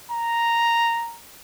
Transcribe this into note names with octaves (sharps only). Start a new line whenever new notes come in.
A#5